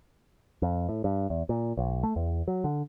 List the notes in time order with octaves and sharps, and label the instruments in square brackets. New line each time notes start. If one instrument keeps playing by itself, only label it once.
[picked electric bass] F2
A2
G2
E2
A#2
B1
A3
E2
F#3
D3